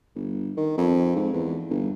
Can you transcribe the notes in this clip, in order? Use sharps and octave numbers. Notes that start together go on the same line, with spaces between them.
G1
D#3
F2
G#2
E2
G1